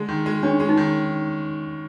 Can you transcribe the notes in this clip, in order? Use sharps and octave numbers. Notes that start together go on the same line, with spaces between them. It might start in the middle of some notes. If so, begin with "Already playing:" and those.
Already playing: D3 G#3
D#3
G#3
C#4 D4
G#3
D#4
D#3